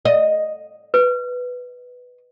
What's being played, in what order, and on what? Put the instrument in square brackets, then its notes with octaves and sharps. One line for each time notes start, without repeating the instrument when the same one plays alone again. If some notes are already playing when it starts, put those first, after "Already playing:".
[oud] D#5
[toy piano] B4